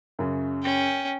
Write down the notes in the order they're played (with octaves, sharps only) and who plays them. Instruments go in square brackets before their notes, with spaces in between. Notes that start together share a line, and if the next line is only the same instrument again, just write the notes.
[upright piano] F#2 C#3
[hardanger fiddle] C#4 G5